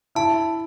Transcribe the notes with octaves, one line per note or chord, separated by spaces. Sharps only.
E4 A5